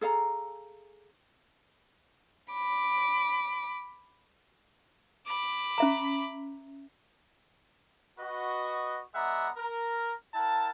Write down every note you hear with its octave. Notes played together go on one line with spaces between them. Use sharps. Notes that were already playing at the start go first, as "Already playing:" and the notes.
G#4 A4 F5 A#5
B5 D6
B5 D6
C#4 E5 A#5
F#4 B4 D#5
G#3 B3 D5 E5 F#5 A#5
A#4
E4 A#4 F#5 A5